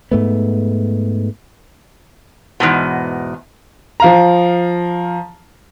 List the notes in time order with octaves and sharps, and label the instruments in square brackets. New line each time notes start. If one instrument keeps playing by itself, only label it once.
[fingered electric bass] G#2 A3 B3
[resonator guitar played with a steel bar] E2 G#2 B2
[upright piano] F3 F5 A#5